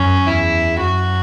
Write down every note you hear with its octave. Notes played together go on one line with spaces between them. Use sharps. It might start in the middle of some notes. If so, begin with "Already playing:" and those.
Already playing: F#2 C#4
E2 E4
F#2 F#4